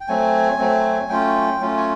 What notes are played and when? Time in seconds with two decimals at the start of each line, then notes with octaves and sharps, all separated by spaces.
0.01 G5
0.08 F#3 A3 C4 G#5
0.59 F#3 A3 C4
1.09 F#3 A3 C#4 F4 G5
1.60 F#3 A3 C#4 F4
1.77 G#5